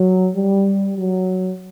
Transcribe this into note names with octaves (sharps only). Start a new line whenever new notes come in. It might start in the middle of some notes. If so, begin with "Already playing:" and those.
Already playing: F#3
G3
F#3